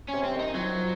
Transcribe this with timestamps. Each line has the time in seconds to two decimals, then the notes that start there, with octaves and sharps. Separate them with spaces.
0.09 C3 C#4
0.24 C4
0.35 D#3 D#4
0.55 F3 F#3